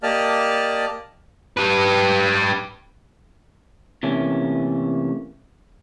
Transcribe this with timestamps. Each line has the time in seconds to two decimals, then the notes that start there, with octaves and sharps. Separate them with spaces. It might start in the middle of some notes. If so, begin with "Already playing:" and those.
0.03 A#3 G4 D5 D#5 A5 F6
1.57 G4 B4
4.03 C3 E3 A3 A#3 C#4